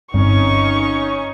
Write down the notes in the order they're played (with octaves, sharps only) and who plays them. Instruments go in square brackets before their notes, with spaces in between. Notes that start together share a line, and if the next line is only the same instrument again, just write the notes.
[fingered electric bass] G1 C4 [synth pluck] G2 [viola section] C#4 D#4 [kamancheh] C#6